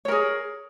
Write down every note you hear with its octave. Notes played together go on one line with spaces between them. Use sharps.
G#4 A#4 C#5